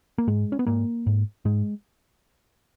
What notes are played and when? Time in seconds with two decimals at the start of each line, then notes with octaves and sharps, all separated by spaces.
0.18 A#3
0.27 G#2 G#3
0.52 C#4
0.59 B3
0.66 G#2 A#3
1.06 G#2
1.45 G#2 G#3